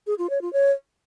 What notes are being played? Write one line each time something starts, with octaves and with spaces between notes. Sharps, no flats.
G#4
F4
C#5
F4
C#5